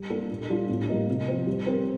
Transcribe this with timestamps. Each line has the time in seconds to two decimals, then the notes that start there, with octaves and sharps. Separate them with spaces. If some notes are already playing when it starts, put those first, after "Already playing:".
Already playing: G3
0.10 A#3 D4 A4
0.30 A#2
0.50 G3 D4 F4
0.69 A2
0.89 G3 A#3 D#4
1.08 C3
1.28 F3 C4
1.47 G3
1.66 C4 G4 A#4